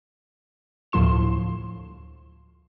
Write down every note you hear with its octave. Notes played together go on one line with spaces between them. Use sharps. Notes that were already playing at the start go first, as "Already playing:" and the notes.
D2 A2 F3 E4 C6 E7